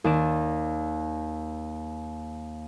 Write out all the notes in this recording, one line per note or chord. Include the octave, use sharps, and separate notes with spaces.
D#2 D5 E7